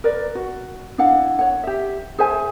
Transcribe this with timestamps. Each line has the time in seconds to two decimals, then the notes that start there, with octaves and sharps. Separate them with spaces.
0.04 A#4 B4 D5
0.35 F#4
0.98 D4 E4 F5 F#5
1.39 C#5 F#5
1.64 G4 E5
2.19 G#4 C5 E5 G#5